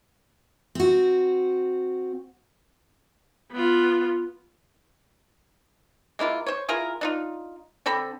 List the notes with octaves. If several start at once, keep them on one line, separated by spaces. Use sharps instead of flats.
C4 F#4
B3 F4
G#3 A#3 E4 F4
C5 C#5
E4 F4 G#4 A#4
D4 D#4 F4
D3 C4 A4 B5